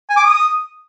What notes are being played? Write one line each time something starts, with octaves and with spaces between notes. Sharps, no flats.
G#5
D6
D#6